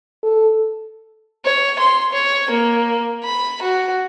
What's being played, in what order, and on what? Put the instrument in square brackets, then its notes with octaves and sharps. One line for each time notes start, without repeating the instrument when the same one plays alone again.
[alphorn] A4
[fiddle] C#5
C6
C#5
A#3
B5
F#4